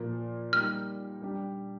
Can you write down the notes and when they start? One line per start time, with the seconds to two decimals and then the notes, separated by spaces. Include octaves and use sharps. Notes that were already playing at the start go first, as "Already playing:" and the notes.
Already playing: A#2 F3 A#3
0.53 G3 A#3 D#4 G4 F6
1.22 G3 D4 G4